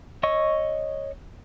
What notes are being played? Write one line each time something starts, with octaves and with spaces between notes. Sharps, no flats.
C#5 D#5 C#6 E6